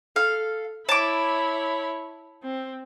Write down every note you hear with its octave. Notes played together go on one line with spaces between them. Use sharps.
A4 F5
E4 C#5 A5 B5 D6
C4